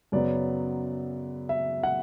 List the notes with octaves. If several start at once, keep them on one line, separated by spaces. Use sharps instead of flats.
F#2 C#3 F#3 B3 D5
E5
F#5